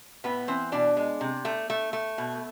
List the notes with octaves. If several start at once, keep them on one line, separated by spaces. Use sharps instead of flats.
A2 B3 B4
E3 C4 C5
B2 D4 D5
G#3
C3
A3
A3
A3
B2